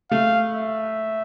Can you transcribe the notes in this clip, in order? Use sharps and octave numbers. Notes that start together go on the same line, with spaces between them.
A3 F5
E5